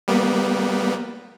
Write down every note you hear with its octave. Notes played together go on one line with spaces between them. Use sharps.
G3 A#3 B3